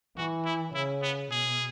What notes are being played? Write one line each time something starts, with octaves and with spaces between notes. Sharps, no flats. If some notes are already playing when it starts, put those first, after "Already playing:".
E3 F#4
E4
C#3 E4
B3
B2 G#4